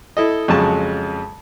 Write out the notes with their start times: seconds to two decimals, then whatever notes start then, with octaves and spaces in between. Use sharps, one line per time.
0.17 E4 A4 D#5
0.48 F2 C#3 F#3 G#3 A5 C#6